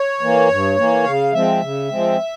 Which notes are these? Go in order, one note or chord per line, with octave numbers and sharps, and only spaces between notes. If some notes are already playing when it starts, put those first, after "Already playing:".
Already playing: C#5
E3 A#3
G2
E3 A#3
C#3 F5
F3 G#3 C4 E5
C#3
F3 G#3 C4